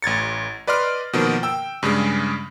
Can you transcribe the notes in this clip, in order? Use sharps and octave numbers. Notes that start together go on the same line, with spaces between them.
A1 G#6 A6 C#7
B4 D5 D#5 C6 F6
B2 D#3 F3 A#3
G5 E6
G2 C#3 G3 G#3